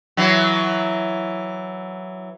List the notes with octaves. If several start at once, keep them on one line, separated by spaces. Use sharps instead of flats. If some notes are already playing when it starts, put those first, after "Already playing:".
E3 F#3